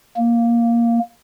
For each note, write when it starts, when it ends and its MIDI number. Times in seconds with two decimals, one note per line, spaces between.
0.17 0.99 58